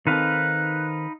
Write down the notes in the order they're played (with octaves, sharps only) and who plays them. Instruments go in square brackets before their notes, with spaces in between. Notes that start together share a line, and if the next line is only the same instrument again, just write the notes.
[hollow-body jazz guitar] D#3 C4 A4 [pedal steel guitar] D#4 B4 F5 [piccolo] F#6